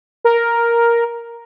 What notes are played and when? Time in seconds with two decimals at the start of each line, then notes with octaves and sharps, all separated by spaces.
0.25 A#4